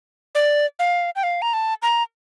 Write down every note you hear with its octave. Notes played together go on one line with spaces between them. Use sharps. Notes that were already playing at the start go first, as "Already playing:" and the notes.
D5
F5
G5
F5
A#5
A5
A#5